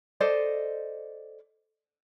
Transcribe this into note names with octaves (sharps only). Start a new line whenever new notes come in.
A4 C5 D5 D#5